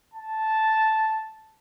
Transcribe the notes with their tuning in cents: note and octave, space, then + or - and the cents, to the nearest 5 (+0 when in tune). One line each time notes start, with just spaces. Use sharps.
A5 -5